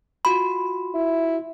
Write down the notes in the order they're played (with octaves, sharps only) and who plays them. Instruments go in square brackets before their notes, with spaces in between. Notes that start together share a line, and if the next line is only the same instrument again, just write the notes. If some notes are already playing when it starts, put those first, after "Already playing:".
[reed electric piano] F4 F#4 C6 [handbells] B5
[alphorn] E4